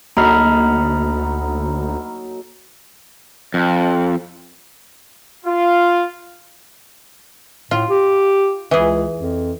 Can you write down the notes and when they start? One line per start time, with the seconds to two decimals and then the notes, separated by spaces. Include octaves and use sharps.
0.17 D2 F#3 A#3 D#4 A4 A#5 B5 F6
3.54 F2
5.45 F4
7.71 A2 F4
7.89 G4
8.71 C#2 E3 G#4
9.16 F2